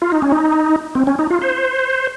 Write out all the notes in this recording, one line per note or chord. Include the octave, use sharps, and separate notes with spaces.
F4
D#4
C#4
D#4
C4
C#4
D#4
F4
C5